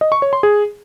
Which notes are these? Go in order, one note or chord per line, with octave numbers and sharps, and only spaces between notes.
D#5
C#6
C#5
C6
G#4